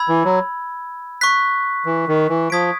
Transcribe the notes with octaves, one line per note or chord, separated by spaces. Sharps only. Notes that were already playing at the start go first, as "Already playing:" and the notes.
Already playing: B5 E6 G#6
E3
F#3
C#6 F#6 B6
E3
D#3
E3
F3 D#6 G#6 B6 D7